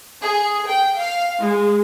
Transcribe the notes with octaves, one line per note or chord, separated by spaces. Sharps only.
G#4
G5
F5
G#3